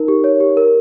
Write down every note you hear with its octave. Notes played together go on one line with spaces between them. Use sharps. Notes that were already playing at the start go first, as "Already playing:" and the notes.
Already playing: D#4 A#4
G4
C#5
G4
A#4